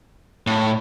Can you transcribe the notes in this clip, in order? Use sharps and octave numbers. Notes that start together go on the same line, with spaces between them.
A2